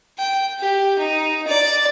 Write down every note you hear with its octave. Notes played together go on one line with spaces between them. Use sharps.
G5
G4
D#4
D5